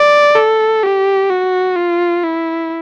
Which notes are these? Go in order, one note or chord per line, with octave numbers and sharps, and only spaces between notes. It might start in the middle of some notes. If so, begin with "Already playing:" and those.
Already playing: D5
A4
G4
F#4
F4
E4